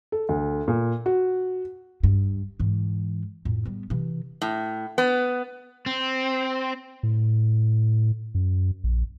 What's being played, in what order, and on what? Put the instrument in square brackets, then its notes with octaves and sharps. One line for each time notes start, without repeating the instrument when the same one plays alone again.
[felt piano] A4
D2
A#2
F#4
[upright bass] G2
G#2 E3
F2 A2
G3 B3
C3 E3
[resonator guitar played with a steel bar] A2
B3
[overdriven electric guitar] C4
[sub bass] A2
F#2
A#1